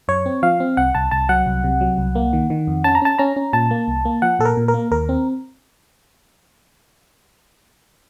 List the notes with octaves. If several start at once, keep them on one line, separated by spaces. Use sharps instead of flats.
F#2 C#5
C4
F3 F5
C4
C2 F#5
C2 A5
C2 A5
F#3 F#5
C2
C3
F#3
C2
A#3
D#3
D#3
F2
C#4 A5
A#5
C#4 A5
C#4 A#5
C#4
A#2 A5
A#3
C2
A#3
F3 F#5
A#2 A4
A#4
A#2
A#4
A#3
D#2 A#4
C4